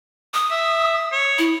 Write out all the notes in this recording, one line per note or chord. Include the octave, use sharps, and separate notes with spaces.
D#6
E5
C#5
E4